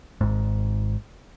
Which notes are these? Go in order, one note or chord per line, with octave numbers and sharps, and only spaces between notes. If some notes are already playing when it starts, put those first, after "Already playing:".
G#1 G#2